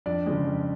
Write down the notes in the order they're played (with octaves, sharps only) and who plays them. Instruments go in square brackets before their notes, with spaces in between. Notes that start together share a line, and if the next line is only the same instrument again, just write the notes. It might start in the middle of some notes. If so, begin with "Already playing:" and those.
[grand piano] F2 D4 D5
C#3 F3 G#3
F2